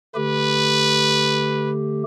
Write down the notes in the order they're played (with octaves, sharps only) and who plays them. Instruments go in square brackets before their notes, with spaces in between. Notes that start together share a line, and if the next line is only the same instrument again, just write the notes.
[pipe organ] D3 A3 G4 [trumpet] B4